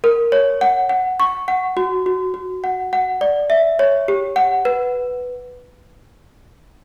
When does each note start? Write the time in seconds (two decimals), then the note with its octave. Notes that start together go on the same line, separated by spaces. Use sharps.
0.04 A#4
0.32 C#5
0.61 F#5
0.89 F#5
1.20 C#6
1.48 F#5
1.77 F#4
2.06 F#4
2.34 F#4
2.64 F#5
2.93 F#5
3.21 D5
3.50 E5
3.79 C#5
4.08 G4
4.36 F#5
4.65 B4